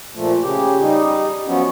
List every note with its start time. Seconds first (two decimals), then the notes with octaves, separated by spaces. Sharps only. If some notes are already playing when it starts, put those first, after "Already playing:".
0.15 A#2 F3 A3
0.43 C#3 G4
0.81 G3 D#4
1.47 F3 F#3 B3 C#4